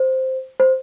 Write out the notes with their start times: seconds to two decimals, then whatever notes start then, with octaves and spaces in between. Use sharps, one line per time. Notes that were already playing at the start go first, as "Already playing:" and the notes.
Already playing: C5
0.60 C5